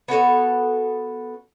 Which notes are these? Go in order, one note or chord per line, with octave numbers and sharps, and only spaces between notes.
B3 F#4 A4 C#5